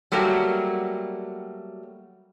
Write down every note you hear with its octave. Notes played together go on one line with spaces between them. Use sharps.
F#3 G3 A3 A#3 F#4